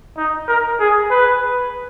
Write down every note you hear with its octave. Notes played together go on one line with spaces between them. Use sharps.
D#4
A#4
G#4
B4